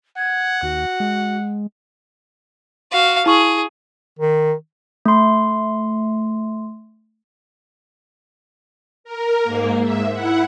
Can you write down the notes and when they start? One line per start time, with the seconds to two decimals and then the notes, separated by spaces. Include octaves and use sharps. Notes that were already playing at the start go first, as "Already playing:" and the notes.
0.17 F#5 G#6
0.62 D#2 F#4
1.00 G#3
2.92 F#4 F5
3.26 E4 G#4 C#6
4.19 D#3
5.06 A3 C6
9.04 A#4
9.44 G#2 A#3
9.82 G#2 E5
10.12 E4 F#5